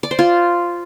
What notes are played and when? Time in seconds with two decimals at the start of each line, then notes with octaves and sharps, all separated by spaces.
0.03 D5
0.11 C5
0.19 F4